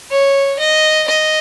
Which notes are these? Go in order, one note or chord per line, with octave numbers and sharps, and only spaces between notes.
C#5
D#5
D#5